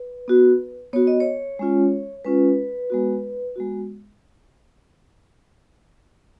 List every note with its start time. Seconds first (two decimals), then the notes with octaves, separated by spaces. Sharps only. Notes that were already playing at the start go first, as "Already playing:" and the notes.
Already playing: B4
0.28 B3 F#4
0.93 B3 F#4 C#5
1.07 D#5
1.20 C#5
1.59 G#3 C#4 F4
2.25 G#3 C#4 F4 B4
2.90 G#3 B3 F#4
3.56 G#3 B3 F#4